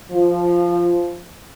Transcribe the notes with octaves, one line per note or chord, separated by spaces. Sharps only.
F3